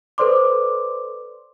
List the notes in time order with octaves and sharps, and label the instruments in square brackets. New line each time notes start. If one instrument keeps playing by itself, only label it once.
[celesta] A4 B4 C5 D5 C6 D6